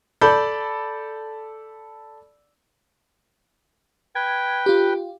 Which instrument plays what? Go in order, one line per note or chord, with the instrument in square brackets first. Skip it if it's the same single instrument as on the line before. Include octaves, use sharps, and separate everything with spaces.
[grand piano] A4 D5 B5 G6
[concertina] B4 G5 [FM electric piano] G#6
[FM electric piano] F4 G4